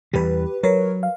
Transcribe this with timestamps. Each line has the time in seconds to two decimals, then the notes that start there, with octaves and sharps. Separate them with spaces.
0.13 E2 E3 G3 G4 B4
0.63 F#3 A#4 B4 C#5
1.03 F5